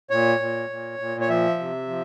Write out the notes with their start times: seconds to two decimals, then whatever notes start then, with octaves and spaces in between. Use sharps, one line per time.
0.10 A#2 C#5
0.40 A#2
0.70 A#2
0.99 A#2
1.21 C#5
1.29 F3 E5
1.59 C3
1.88 F3